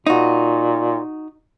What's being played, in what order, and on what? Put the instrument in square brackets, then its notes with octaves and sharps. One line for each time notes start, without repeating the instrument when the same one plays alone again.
[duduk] A#2 [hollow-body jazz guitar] D#4 F#4